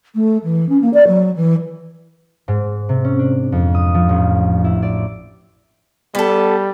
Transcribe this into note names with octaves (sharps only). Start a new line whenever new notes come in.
A3
E3
C#4
A#3
D5
F#3
E3
G#2
C3
C#4
D4
F2
D#6
F3
A1
E4
D5
G3 B3 A4